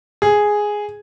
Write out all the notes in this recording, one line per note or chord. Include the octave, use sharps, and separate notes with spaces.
G#4